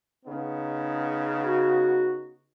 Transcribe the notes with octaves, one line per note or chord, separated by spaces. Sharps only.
C#3 B3 D#4
F#4